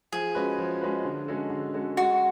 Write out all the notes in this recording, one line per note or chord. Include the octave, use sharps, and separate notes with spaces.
F3 G#4
G#3 C#4 F#4 B4
F3
G#3 C#4 F#4 B4
D3
G#3 C#4 F#4 A4
D3
G#3 C#4 F#4 A4
G#3 F#4